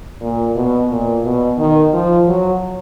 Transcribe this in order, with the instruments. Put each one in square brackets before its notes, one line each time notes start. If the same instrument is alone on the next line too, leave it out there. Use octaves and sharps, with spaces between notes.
[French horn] A#2
B2
A#2
B2
D#3
F3
F#3